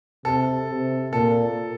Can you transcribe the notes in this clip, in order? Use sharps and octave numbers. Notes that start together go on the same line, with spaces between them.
C3 A4
C3
A#2 A4